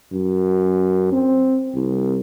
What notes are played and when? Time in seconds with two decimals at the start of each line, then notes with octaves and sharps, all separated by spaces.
0.13 F#2
1.12 C4
1.75 C2